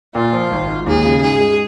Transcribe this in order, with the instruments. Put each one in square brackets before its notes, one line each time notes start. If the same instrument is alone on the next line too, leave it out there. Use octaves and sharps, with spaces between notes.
[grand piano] A#2 [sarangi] F4
[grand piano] F3
G#1
G#2
[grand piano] D#2 [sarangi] G#4
[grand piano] C#3
[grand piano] G#2 [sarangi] G#4
[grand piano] G#3